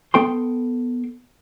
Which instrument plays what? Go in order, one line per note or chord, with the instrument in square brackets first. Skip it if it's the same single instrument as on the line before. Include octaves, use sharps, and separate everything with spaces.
[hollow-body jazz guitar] B3 A4 G5 C6